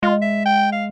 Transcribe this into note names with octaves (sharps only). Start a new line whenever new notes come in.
G#3 F4
E5
G5
F5